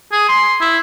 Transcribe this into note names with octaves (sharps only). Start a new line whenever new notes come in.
G#4
C6
E4